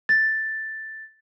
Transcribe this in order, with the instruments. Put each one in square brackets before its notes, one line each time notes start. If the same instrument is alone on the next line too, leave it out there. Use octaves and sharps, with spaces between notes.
[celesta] A6